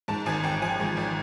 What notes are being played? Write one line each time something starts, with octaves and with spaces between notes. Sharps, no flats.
G#2 A5
G#1 G#5
G#1 G5
F3 G#5
G#2
G#1